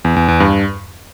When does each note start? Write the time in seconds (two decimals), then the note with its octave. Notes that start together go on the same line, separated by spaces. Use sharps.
0.05 E2
0.16 E2
0.28 E2
0.40 G2